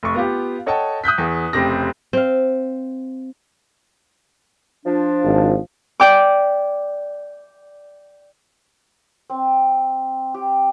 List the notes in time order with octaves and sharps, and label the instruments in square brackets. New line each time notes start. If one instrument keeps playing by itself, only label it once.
[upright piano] F1 C#6
B3 F4 G4
A4 C#5 D#5 F#5 G5 A5
D#6 F#6 G6 B6
E2 G#4
F1 F2 C#3 C4 G4 A#6
[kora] C4 F5
[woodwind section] F3 D4
[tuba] G#1
[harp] D5 G5 D6
[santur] C4
G4